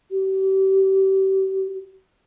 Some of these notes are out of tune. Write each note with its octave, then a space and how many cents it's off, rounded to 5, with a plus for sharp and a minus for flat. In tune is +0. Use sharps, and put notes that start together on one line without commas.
G4 -35